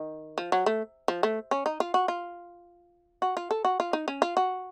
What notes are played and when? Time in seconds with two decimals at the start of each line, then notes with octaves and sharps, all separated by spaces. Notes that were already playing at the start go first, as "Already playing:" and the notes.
Already playing: D#3
0.38 F3
0.52 F#3
0.66 A3
1.08 F3
1.23 A3
1.51 C#4
1.66 D#4
1.80 F4
1.94 F#4
2.08 F4
3.22 F#4
3.37 F4
3.51 A4
3.65 F#4
3.80 F4
3.93 D#4
4.08 C#4
4.22 F4
4.37 F#4